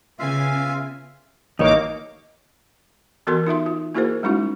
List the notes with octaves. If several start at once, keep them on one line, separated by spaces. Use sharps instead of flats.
C#3 B3 F4 E5 F5 G#5
A1 D#2 A#3 D#4 C#5 D6
E3 B3 F#4 A4 A#4 C6
D#4 F4 E5 C6
F4
A#3 E4 F#4 G#4 A#4 C5
G3 G#3 C#4 D#4 E4 F#4